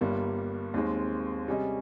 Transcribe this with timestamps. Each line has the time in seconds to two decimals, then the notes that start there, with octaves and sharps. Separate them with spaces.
0.01 G1 G2 G3 A#3
0.74 D#2 D#3 G#3 C4
1.47 C3 G3 C#4 G#4 D#5